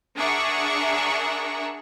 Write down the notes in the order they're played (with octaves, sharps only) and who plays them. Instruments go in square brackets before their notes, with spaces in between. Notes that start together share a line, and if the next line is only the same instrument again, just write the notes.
[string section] D4 G#4 A#4 E5 F#5 C#6